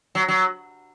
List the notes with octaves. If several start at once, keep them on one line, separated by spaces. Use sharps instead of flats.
F#3
F#3